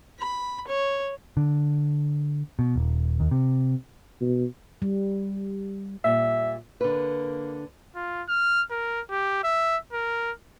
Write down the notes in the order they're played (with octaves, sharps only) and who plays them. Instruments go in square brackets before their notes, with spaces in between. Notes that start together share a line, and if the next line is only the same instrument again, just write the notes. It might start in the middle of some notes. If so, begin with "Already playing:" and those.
[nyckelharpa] B5
C#5
[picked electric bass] D3
B2
D#1
D#2
C3
[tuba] B2
[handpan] G3
[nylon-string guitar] A#2 G3 [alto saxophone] E5
[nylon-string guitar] D3 B4 [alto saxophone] A#3
[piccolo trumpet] F4
F6
A#4
G4
E5
A#4